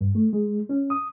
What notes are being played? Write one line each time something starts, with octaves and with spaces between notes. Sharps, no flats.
G2
A3
G#3
C#4
D#6